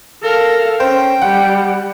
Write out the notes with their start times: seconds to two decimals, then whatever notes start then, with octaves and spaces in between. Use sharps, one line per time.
0.23 A4 A#4 F5
0.80 C#4 C5 G5
1.22 G3 F#5